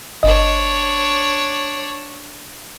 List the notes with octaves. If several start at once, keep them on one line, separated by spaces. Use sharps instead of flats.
G1 D4 C#5 D#5